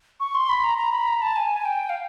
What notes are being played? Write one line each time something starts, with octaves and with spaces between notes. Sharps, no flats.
C#6
C6
B5
A#5
A#5
B5
A#5
A5
G#5
G5
F5